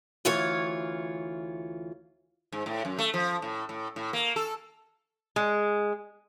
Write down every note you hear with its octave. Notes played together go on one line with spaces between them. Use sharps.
D2 E3 F4 C#5
G#2
A2
F#2
A3
F3
A2
A2
A2
A#3
A4
G#3